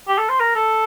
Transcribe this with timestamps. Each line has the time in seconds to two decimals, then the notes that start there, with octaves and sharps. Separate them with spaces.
0.08 G4
0.18 A4
0.29 C5
0.40 A#4
0.55 A4